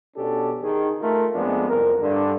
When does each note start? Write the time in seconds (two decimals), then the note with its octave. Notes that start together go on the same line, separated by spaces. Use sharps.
0.16 B2 C#4 D4 G4 A4
0.63 D#3 G#4
1.02 A3 F4 A#4
1.34 F2 G#3 A3 B3 D4
1.69 C2 F2 A#4
2.02 G2 D3